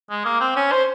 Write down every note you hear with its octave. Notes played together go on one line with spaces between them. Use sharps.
G#3
A#3
C4
C#4
C5